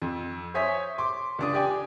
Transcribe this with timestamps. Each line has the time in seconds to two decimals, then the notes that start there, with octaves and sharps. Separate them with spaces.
0.02 F2
0.54 C5 C#5 E5 G#5 D#6 B6
0.98 C6 D6
1.39 C#2 D4 D#6
1.53 G4 D5 G5 G#5